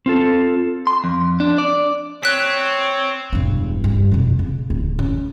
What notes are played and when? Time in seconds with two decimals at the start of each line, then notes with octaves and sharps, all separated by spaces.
0.06 C4 F4 A4
0.87 C6
1.04 F2
1.40 D4
1.58 D5
2.23 C4 C#5 F#6 B6
3.33 E1 G2
3.84 G2 G3
4.12 F2 B2
4.39 C#3
4.70 D1
4.99 C#4